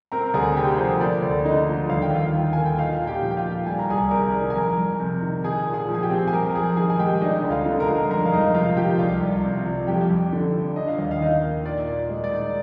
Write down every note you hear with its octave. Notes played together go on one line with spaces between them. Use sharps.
C4 A#4 A#5
D2 G#4 G#5
C3 G4 G5
F3 C5
A#3 D5
D2
D3 D#4 D#5
F3
D#2 F5
G5
D#2 F4 F5
D#3
A#3 G#5
G5
D#4 F4 F5
A#2
G4 G5
F3
G5
F4 F5
A#3
G3 G#5
A#5
C2 G#4 G#5
C3 A#4 A#5
D#3
G#5
F2 A#4 A#5
F2
C3
D#3
D#4 G#4 G#5
A#2
G#4 G#5
F3
G#5
G4 G5
C4
G#5
F2 A#4 A#5
F2 G#4 G#5
D#3 G#4 G#5
G#5
G#3 G4 G5
D4 D#4 D#5
D2
F4 F5
D3
A#4 A#5
G#3
F2 A#4 A#5
F5
F2 D#4 D#5
C3 F4 F5
F5
F3 G4 G5
C2 F4 F5
C2
C3
F3
F2 G4 G5
F2
D3
F3
D4 D#5
F5
D#2 D#5
F5
D#3 D#4 D#5
A#3
A#2 D5
A#2
G#3
D5
D#4